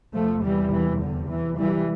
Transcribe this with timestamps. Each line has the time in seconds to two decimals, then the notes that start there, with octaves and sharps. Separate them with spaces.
0.15 E2 C3 F3 A3
0.44 E3 G3
0.72 E3
1.01 D3
1.29 E3
1.58 E3 G3